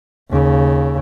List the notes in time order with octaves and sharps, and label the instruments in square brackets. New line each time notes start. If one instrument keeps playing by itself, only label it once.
[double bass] D#2 C#3